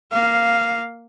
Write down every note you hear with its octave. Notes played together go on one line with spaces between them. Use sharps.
A#3 F5